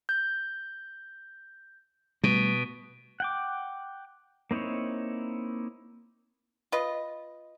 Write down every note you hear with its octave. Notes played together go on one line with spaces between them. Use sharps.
G6
B2 G3 A3
F#5 G5 D6
A#3 C4 D#4 E4 C#5
F4 B4 D#5